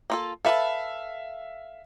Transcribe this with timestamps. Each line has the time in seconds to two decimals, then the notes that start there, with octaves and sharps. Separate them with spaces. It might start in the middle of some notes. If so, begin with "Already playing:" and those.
0.10 A#3 F4 A4
0.45 A4 B4 E5 F5 A5